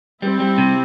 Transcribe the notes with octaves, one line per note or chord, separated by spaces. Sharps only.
G3 C4 E4
G3
C3